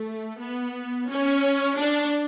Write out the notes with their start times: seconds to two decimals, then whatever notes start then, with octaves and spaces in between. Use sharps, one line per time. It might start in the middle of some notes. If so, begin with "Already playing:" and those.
Already playing: A3
0.41 B3
1.10 C#4
1.80 D4